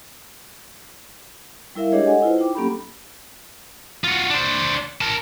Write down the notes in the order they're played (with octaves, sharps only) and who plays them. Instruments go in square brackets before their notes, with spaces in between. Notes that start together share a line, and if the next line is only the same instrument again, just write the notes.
[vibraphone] G3 E4 A#4 E5 F5
G#3 D4 G4 G#4 C#5 D#5
A4 D#5 F#5 G#5
E4 F4 B4 C5
D#4 G5 D6
F#3 A#3 C#4 G4 A4 B5
[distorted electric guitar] F4 F#4
D4 C5
A#4 A5